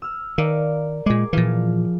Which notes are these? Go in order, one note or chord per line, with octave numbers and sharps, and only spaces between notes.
E6 F6
D#3 A#4 D5 F5
A#2 G#3 G#4 D6
A#2 E3 F3 F5